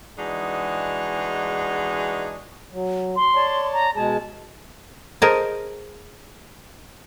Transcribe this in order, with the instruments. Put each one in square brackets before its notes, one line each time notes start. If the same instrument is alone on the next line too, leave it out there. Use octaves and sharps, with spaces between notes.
[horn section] E3 G#3 D4 D#4 F#4 G#4
[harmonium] F#3
[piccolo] C6
[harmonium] C#5 D5 A5
[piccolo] A#5
[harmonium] B2 G#3 G#4 [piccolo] A5
[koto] G#4 A#4 C5 D#5 G#5 A5